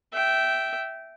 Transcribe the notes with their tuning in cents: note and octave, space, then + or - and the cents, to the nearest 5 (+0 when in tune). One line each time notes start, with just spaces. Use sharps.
E5 +0 G5 -15